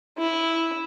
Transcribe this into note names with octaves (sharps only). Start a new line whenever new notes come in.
E4